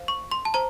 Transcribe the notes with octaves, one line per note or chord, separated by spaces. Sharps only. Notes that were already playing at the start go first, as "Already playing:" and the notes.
Already playing: C5 F5
C#6
C6
A5
C5 A#5